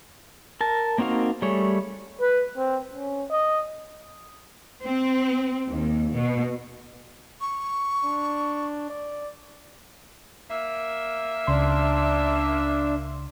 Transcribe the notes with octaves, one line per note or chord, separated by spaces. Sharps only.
A#4 A5
A#3 C4 D#4 F#4 F5
G3 A3 G#4 C#5
B4
C4
C#4
D#5
C4
D#2
B2
C#6
D4
D5
A#3 E5
C#2 C#3 D4 C6